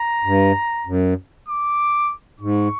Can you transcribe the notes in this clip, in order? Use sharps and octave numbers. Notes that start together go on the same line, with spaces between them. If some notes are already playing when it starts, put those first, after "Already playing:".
Already playing: A#5
G2
F#2
D6
G#2 C#6